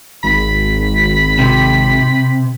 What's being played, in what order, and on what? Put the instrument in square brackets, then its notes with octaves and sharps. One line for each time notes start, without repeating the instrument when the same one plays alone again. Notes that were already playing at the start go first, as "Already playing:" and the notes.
[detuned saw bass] G#1 [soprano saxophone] B5
[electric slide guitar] C3